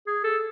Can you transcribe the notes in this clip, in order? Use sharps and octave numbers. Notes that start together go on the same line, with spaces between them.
G#4
A4